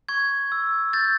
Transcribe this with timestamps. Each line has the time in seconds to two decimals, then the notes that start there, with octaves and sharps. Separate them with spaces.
0.09 C#6 G#6
0.52 E6
0.93 G6 A6